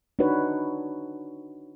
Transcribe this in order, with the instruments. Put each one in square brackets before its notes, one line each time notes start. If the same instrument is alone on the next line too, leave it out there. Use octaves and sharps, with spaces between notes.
[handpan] D4 D#4 F#4 B4 C#5